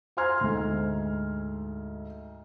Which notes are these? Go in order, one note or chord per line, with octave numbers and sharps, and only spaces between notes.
C5 G#5 A#5 C6 F6 G#6
D2 G#2